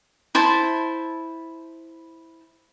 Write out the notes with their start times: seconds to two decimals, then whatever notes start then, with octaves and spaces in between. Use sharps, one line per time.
0.35 E4 C5 A5